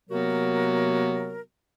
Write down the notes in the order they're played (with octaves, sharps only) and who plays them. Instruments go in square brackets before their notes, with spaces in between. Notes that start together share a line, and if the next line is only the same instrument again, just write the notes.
[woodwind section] C3 F#3 A#3 B3 F#4 A#4